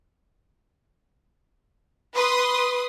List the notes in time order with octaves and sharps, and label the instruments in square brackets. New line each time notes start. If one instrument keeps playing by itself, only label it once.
[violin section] B4 C6 D#6